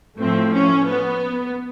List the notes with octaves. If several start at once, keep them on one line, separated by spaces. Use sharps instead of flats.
A2 F3 A3 C4
C#4
B3